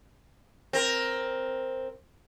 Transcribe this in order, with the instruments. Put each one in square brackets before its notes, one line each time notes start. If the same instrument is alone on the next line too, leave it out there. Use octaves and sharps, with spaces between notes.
[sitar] C4 A#4